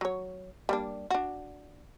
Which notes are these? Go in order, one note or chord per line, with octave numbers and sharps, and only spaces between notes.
F#3 C#5
G3 A#3 D4
D4 F#4